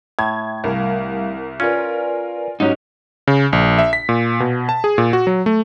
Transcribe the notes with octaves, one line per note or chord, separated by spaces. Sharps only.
A2 E5 G#6
C2 G3 A#4 F5
C#4 F4 A#4 B4 D5 G#5
G#2 F#3 C#4 D#4 G4
C#3
A#1
E5
B6
A#2
B2
A5
G#4
A#2
F#4
F#3
A3